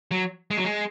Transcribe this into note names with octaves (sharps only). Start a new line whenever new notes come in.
F#3
G#3
F#3
G#3